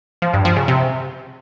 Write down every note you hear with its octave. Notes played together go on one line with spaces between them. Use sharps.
F3
G2
F3
C#3
C3